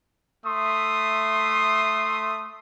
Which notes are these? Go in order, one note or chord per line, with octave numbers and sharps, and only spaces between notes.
A3 E5 C6 D#6